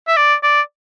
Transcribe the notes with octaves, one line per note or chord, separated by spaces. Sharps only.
E5
D5
D5